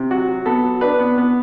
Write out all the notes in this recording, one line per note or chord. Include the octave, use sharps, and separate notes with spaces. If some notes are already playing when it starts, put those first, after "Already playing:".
Already playing: C3
F#3 F#4
F#3
B3 A4
F#3
D4 B4
B3
B3